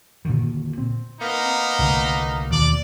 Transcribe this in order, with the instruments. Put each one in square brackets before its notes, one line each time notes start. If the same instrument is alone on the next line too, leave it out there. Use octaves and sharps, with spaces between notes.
[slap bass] A#2 D3 D#3
C4
[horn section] A#3 B3 D#4
[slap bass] C2 D3 A3
[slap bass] D#2 B2 [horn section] D5